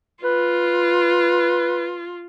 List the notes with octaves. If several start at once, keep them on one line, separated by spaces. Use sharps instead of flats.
F4 B4